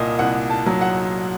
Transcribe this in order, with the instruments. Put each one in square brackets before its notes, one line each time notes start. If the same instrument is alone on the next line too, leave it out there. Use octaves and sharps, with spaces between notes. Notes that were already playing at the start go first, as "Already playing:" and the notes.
Already playing: [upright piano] C2 A#2 D#5
C2 F#5
A5
F#3
F#5